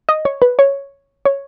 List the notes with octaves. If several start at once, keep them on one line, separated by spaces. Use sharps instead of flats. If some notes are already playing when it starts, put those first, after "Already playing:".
D#5
C#5
B4
C#5
C#5